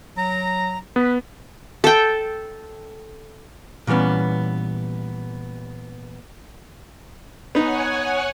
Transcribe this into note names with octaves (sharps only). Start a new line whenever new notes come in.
F#3 A#5
B3 B4
A4 G5
A#2 E3 G3 B3 C#4
B3 D#4 C#5 F#5 G#5